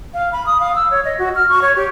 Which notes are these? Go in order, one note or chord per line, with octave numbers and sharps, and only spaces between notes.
F5
B5
D#6
F5
E6
C#5
D#5
F#4
F6
C#6
C#5
G4